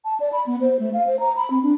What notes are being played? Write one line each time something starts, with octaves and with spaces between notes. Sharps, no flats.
A5
D5
B5
B3
C5
A3
F5
C5
A#5
B5
C4
D4